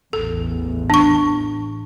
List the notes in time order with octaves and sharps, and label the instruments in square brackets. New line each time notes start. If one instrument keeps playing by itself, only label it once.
[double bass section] A1 E2 [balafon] A4
[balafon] D4 C#6